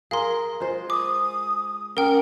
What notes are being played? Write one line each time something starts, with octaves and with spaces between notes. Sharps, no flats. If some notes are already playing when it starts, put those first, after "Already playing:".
G#4 A#4 F5 C6
G#3 F4 C5
D6 D#6
A#3 C#4 A#4 F#5 G5 F6